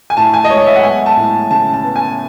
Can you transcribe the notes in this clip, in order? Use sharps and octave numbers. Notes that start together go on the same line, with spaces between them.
G#5
A2 A5
G#5
D#5
G#3 C#5
E5
F#5
B3 G#5
A5
A2
C#3 A5
A5
B3
G#5